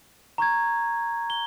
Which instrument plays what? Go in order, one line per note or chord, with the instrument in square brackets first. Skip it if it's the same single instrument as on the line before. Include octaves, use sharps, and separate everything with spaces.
[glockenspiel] A#5 C#6 G6 G#6
G7